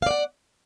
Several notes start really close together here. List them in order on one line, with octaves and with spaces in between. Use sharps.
F5 D5 F#5